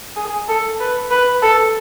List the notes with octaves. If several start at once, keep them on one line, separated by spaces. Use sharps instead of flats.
G#4
A4
B4
B4
A4